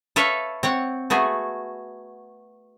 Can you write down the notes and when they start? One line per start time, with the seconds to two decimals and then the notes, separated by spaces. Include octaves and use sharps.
0.16 A4 B4 C#5 E5 F5
0.63 C4 C#5 F#5
1.10 A3 B3 F#4 G#4